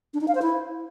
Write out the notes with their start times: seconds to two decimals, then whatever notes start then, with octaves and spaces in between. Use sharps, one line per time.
0.14 D4
0.21 D#4
0.28 F5
0.35 C5
0.42 E4